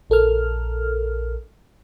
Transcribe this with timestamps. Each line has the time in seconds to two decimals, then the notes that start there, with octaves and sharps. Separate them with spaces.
0.10 A#1 A4 A#4 F6